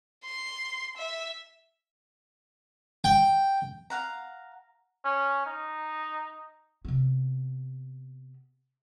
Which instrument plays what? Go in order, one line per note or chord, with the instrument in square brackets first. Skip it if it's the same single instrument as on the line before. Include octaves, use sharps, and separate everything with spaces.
[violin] C6
E5
[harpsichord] G5
[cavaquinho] F5 F#5 A#5
[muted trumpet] C#4
D#4
[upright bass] C3 B3